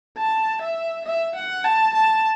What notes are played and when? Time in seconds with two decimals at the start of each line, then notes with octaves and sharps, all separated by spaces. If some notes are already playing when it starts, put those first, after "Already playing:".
0.18 A5
0.61 E5
1.06 E5
1.36 F#5
1.64 A5
1.94 A5